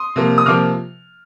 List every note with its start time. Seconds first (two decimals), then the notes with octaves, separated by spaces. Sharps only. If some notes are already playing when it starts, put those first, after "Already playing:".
Already playing: C6 D#6
0.16 C3 F3 A#3
0.38 D#6
0.46 C3 F3 A#3 D6 F6